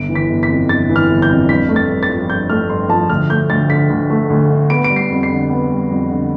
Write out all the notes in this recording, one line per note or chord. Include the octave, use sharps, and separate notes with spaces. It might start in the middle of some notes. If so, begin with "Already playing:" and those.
Already playing: G1 D7
E3
B6
G1
B6
F2
G1 A6
E3
F6
G1
G6
F2
G2 B6
A3
A6
G2
A6
F3
G2 G6
A3 F6
G2 C6
F3 A5
D2 F6
A3 G6
D2 A6
D3 B6
D2
A3
D2
D3
B3 D7
D7
G3
C7
F2
C7
D3
B3
G3
F2
D3